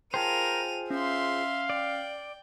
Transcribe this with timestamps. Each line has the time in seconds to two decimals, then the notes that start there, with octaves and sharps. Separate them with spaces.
0.14 F4 G#4 A#4 C5 G5 A5 D#7 F7
0.90 C#4 E5 F5 C6
1.70 D5 G5